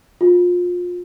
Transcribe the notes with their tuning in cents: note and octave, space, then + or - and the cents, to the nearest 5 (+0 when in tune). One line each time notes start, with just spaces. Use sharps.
F4 +25